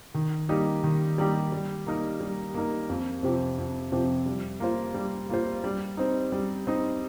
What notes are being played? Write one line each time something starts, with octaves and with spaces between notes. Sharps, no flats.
D#3
G3 A#3 D#4 G4
D#3
G3 A#3 D#4 G4
G3
A#3 D#4 A#4
G3
A#3 D#4 A#4
F2
C3 F3 C4 G4
F2
C3 F3 C4 G4
G3
A#3 F4 C5
G3
A#3 F4 C5
G3
C4 D#4
G3
C4 D#4